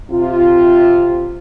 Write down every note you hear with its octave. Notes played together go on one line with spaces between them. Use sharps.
C3 F4